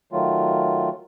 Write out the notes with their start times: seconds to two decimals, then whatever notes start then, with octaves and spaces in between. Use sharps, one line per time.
0.12 D#3 F#3 A3 F4